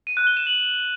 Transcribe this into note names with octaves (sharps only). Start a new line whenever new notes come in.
D#7
F#6
G7
E7
F#7